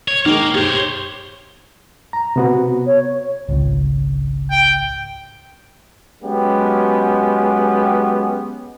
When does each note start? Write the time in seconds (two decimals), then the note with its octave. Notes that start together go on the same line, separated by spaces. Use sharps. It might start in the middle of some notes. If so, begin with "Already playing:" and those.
0.08 C#5
0.26 D#3 G#3 A#3
0.55 G4 C5 C#5
2.13 A#5
2.36 C3 B3 F#4
2.87 C#5
3.49 G#1 C#2
4.51 G5
6.23 F#3 G#3 B3 C#4 G4